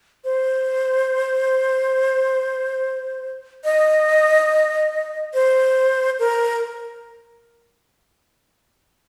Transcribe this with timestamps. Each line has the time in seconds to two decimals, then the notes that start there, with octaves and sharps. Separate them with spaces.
0.24 C5
3.64 D#5
5.34 C5
6.19 A#4